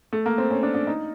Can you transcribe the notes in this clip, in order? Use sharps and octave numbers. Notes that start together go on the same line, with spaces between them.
A3
A#3
C4
C#4
D4
D4
D#4